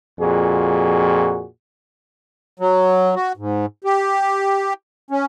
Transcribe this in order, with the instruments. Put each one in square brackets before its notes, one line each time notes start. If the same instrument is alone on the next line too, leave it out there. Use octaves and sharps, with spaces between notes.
[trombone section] F2 A#2 F#4 G#4
[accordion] F#3
F#4
G#2
G4
C#4